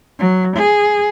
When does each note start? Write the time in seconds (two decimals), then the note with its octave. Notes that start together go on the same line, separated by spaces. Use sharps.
0.19 F#3
0.57 G#4